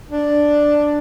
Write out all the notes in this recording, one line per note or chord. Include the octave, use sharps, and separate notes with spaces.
D4